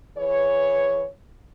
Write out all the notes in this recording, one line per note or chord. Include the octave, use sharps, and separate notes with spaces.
E3 G#4 B4 C#5